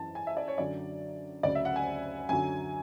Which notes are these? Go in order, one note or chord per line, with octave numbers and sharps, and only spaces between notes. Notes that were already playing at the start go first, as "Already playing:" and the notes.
Already playing: F#2 E3 A5
G#5
E5
D5
C#5
F#2 D3 F#3 D5
D2 C#3 F#3 D5
E5
F#5
G#5
F#2 D3 F#3 G#5